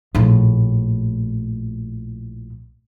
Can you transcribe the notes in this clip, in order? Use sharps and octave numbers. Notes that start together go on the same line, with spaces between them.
A#1 A2